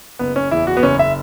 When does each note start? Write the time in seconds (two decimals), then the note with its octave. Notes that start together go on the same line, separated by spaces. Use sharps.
0.19 F#1 B3
0.36 C#4
0.51 E2 E4
0.67 F#4
0.77 B3
0.83 F#1 C#4
0.99 E5